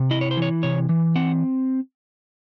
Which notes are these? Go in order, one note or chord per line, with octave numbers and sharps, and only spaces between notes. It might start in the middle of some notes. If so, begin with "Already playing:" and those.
Already playing: C3
E4 D#5
C#5
C5
E3 C#5
C3 C#5
E3
C4 F#5